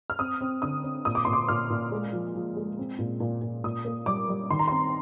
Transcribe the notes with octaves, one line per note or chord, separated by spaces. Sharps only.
F6
C4 D#6
C4
D3 D#6
C4
A#2 D#6
D6
A#2 C6
D6
A#2 F6
A#2
G#3
F3
F3
G#3
C4
A#2
A#2
A#2
A#2 D#6
A#3
G3 D6
G3
D#3 C6
A#5
C4 C6